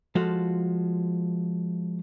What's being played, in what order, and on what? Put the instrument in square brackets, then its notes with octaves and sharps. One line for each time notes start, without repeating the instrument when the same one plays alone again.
[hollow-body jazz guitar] F3 G#3 F4 F#4 A4